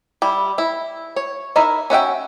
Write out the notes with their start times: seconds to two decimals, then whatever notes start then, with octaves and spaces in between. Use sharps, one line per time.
0.22 G3 E4
0.58 E4
1.16 C#5
1.56 D#4 E4 A#4 E5
1.90 C#4 F#4 E5 G5